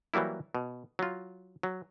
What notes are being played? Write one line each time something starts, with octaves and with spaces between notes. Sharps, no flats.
E3 F#3 G3 A#3 E4
B2
F#3 F4
F#3